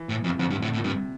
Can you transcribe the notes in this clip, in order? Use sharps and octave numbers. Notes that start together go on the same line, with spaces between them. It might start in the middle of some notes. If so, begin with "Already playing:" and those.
Already playing: E3
A2
F2
C3
F2 D3
G2
A2
A2
A#2
G2 C3